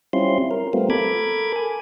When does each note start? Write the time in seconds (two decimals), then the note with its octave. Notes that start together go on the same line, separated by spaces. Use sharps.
0.13 G3 C4 C#4 E4 F4 C6
0.51 A#4
0.73 G3 A3 B3 C4 F4
0.90 A4 A#4 B5 D6 G#6
1.56 G#5